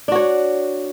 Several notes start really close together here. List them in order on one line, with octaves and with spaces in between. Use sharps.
D4 F#4 C#5